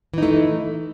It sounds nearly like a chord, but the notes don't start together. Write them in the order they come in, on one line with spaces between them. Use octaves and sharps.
E3 D#4 A3